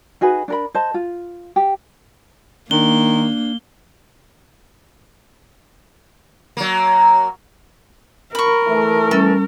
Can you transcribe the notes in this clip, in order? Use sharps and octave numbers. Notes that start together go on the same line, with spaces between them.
D#4 F#4 G#4 B4
D4 A#4 B5
C5 D#5 A5
F4
G4
D#3 A#3 D4 G7
F#3 A#3
A#4 B5 C#6
E3 A3
G3 C#4 A4